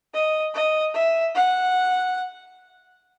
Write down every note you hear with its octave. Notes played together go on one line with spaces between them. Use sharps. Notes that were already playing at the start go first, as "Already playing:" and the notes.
D#5
D#5
E5
F#5